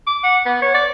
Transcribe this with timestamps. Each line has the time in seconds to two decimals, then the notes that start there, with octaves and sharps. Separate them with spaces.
0.07 D6
0.24 F#5
0.46 B3
0.62 C#5
0.74 D5